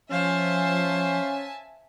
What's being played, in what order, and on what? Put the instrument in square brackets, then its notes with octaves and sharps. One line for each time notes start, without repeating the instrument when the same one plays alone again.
[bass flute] F3 [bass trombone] C#4 [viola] C5 F5 [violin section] E5 G#5 A5